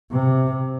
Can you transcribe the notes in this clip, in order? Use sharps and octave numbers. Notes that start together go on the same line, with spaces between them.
C3